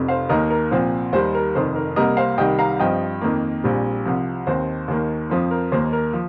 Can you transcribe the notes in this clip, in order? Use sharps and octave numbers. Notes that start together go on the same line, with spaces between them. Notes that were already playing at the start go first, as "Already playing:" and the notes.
Already playing: F1 F2 C3
C5 F5
D#2 D#3 A#3 A#4 D#5
A#4
C2 A#2 F3 C4 C5
D#2 D#3 G3 C5
A#4
F1 F2 D#3 C5
A#4
C2 C3 G3 A#3 A#4 D#5
C5 F5
C2 C3 D#3 G3 D#5 G5
F5 A#5
G2 F3 C4 D#5 G5
F2 D#3 A#3
A#1 A#2 G3 C4
C2 C3 F3
D#2 D#3 C4 C5
D#2 D#3 A#3
F2 F3 C4 C5
A#4
D#2 D#3 A#3 C5
A#4
F3